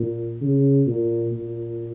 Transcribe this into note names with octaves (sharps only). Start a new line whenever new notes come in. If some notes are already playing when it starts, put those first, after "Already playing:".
Already playing: A#2
C#3
A#2
A#2